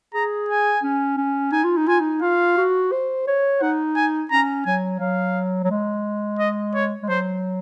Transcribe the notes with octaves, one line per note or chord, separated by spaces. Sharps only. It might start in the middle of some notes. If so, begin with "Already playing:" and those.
G#4 A#5
G#5
C#4
C#4
D#4 G#5
F4
D#4
F4 G#5
D#4
F4 F5
F#4
C5
C#5
D#4 F#5
G#5
C#4 A#5
F#3 G#5
F#3 F5
F#3
G#3
D#5
C#5
G#3
F#3 C5